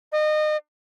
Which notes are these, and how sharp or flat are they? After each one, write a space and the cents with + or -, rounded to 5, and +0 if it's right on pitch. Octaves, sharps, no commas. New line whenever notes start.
D#5 -30